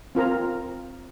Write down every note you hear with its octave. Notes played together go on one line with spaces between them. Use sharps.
C4 F4 A#4 A#5